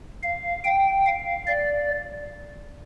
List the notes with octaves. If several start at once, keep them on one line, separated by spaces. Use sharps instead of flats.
F5
G5
F5
D5